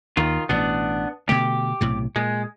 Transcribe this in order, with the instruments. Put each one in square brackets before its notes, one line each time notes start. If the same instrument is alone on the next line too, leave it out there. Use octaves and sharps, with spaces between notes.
[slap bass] D#2 [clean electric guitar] D#3 F4
[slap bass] A1 B2 [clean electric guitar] B3 D4
[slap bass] B2 D3 A3 [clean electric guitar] G4
[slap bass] B1 A2 C3
[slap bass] A#2 [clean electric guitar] G#3